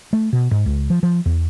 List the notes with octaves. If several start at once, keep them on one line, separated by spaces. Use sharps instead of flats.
A3
B2
G#2
C#2
F3
F3
E2